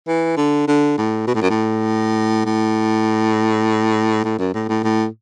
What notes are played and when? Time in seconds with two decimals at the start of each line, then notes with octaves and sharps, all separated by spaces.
0.07 E3
0.37 D3
0.67 D3
0.98 A2
1.27 B2
1.35 A2
1.42 F#2
1.50 A2
2.45 A2
4.24 A2
4.39 F#2
4.54 A2
4.69 A2
4.84 A2